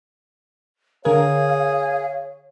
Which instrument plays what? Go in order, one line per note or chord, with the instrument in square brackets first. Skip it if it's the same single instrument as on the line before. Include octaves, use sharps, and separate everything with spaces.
[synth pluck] D3 A#4 [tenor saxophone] G#4 [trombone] C#5 [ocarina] F5